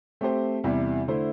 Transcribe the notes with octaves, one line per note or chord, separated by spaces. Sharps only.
A3 C4 G4 C5
E2 C3 G3 E4
D3 A3 E4 C5